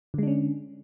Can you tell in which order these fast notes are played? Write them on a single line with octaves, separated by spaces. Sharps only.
D3 G#3 D4 C#4